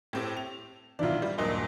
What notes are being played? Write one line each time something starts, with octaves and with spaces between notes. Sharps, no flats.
A2 C4 G4
F7
B1 D#3 D4 E4 F4
G3
D#1 G2 A#2 F#3 D#5 G7